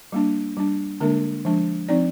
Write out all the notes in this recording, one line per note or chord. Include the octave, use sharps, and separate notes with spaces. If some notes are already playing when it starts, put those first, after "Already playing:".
G3 A#3 D4
G3 D4
D3 G#3 A#3 D4 A#4
F3 G#3 D4
F3 C4 D#4 D5